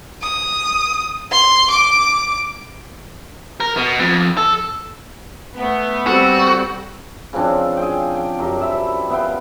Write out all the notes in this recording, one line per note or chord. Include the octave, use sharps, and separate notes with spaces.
D#6
C6
D6
A#4
B2
F2
A4
A3 B3
G3 C4 F#4 A4
C#3 F3 C4 D4
G#4 F5 G5
G5
F#2 G4 A#4
C5 E5 B5
B3 E5 F5 G5